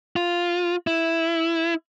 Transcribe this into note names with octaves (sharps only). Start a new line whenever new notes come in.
F4
E4